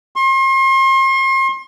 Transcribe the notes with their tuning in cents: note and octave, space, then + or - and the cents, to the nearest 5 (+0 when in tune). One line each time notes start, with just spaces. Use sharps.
C6 +40